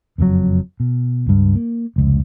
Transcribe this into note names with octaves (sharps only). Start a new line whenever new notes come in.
F#1 F2 G#2 F#3
B2
C#2 G2
A#3
F1 C#2